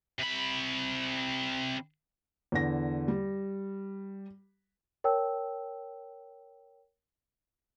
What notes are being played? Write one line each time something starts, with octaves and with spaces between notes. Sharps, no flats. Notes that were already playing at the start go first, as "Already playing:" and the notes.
C3 B5
E2 D3 A#6
G3
A#4 C#5 G5 A5 E6